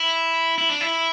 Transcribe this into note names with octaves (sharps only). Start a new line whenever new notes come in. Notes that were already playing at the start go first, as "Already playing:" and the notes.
Already playing: E4
E4
D4
E4